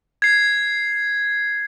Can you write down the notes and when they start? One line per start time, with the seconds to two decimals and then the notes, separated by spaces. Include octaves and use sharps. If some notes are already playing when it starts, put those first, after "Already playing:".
0.22 G#6 C7